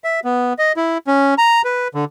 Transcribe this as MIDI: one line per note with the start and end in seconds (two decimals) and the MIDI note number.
0.04 0.20 76
0.25 0.53 59
0.59 0.72 75
0.77 0.98 64
1.07 1.34 61
1.38 1.62 82
1.65 1.88 71
1.95 2.05 50